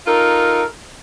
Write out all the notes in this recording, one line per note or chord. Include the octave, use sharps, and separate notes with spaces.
D#4 F4 A4 A#4